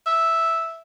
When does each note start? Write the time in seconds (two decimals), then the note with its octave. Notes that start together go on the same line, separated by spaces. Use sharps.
0.06 E5